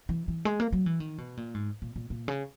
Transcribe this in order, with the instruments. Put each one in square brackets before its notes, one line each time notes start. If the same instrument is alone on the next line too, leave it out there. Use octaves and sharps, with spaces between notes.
[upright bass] E3
E3
G#3
A#3
F#3
E3
D#3
B2
A#2
G#2
A#2
A#2
A#2
C#3